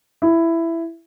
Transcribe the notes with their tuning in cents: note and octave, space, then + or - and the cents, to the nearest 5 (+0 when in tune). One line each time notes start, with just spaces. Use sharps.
E4 +10